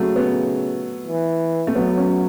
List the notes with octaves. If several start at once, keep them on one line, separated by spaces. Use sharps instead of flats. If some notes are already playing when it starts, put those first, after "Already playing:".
Already playing: C#3 F#3 A3
B3
E3
A3
F#3 B3
C#4